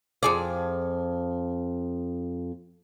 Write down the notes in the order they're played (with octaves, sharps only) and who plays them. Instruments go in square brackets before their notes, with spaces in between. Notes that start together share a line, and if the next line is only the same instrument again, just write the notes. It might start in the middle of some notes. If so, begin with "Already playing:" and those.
[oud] F2 G#4 D5